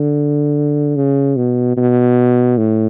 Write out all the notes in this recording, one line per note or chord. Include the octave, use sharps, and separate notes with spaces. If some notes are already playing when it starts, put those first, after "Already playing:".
Already playing: D3
C#3
B2
B2
A2